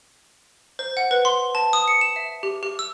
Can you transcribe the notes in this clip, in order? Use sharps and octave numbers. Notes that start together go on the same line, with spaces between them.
C5
F#5
B4
C6
A5
D#6
C#7
E7
E5
G4
G4
E6